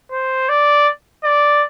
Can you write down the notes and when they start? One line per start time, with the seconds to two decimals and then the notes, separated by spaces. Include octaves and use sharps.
0.11 C5
0.49 D5
1.24 D5